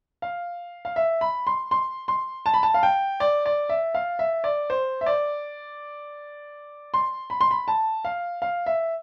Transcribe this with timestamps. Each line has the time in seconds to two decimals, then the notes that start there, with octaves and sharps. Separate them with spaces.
0.22 F5
0.85 F5
0.96 E5
1.21 B5
1.47 C6
1.71 C6
2.08 C6
2.46 A5
2.54 B5
2.63 A5
2.74 F5
2.83 G5
3.20 D5
3.46 D5
3.69 E5
3.95 F5
4.19 E5
4.44 D5
4.70 C5
5.01 E5
5.06 D5
6.94 C6
7.30 B5
7.41 C6
7.51 B5
7.68 A5
8.05 F5
8.42 F5
8.66 E5